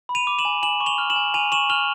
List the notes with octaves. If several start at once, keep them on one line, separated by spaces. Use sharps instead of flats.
B5
D#7 F7
D6
E7 F#7
G#5
G#5 E7 F#7
C#6
F7 G7
F6
E7 F#7
G#5
G#5 D#7 F7
C#6 E7 F#7
F6 F7 G7